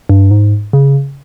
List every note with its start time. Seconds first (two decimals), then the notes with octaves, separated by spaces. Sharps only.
0.09 G2
0.31 G#2
0.73 C#3